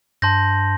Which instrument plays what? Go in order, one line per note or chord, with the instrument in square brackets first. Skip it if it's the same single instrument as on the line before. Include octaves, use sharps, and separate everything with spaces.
[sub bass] G2 [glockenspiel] A5 C6 G6 A#6